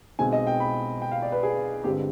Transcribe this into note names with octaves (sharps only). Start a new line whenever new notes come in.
B1 B2 G#3 C4 G#5
D#5
G5
B5
G5
F5
D5
B4
G#4
G1 G2 D3 G#3 C4 G4